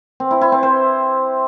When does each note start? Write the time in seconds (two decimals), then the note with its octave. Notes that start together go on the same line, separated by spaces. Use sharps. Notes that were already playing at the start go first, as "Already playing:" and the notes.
0.20 C4
0.31 E4
0.41 E4
0.52 C4
0.63 C5